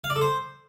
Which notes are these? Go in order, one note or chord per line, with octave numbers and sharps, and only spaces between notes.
F5
D5
A4
C5